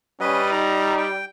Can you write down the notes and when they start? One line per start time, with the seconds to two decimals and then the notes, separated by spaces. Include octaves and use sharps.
0.21 G3 C#4 B4 D#5
0.52 D#4 A#5
0.98 G5